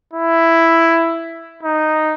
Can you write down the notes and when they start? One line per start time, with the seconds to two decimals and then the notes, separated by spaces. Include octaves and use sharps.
0.13 E4
1.63 D#4